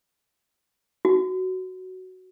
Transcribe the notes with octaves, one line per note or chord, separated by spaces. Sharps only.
F#4